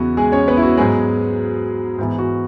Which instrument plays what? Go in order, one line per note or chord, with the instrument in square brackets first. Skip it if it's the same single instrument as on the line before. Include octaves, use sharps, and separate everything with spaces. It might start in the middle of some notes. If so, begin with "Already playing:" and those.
Already playing: [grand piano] E2 C#3 E3 B3 F#4
G#3 G#4
C#4 C#5
B3 B4
E4
F#4
G#2 F#3 G#3 B3 G#4
G#2 E3 B3
F#4